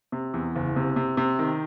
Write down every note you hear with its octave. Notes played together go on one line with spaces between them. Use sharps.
C3
E2
F#1
C3
C3
C3
D#3